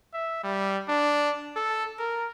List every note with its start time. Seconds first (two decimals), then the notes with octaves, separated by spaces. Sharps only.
0.13 E5
0.43 G3
0.89 D4
1.56 A4
1.99 A#4